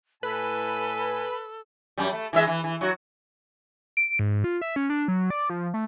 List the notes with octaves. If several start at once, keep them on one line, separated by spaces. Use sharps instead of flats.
A2 A4 B4 G#5
F#2 G3
A3
E3 G#3 E5
E3
E3
F#3 F#4
D7
G#2
F4
E5
C#4
D4
F#3
D5
F3
A3